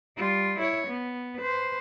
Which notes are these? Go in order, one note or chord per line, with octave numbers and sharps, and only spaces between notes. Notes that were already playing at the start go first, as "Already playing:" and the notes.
G3 F4
E4 C#5
B3
B4 C5